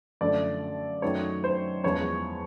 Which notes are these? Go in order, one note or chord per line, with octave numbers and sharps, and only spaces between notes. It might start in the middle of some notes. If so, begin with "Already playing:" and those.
F#2 D3 F3 A3 D5
F#2 D#3 F#3 A3 C#5
C5
E2 C#3 F3 G#3 C#5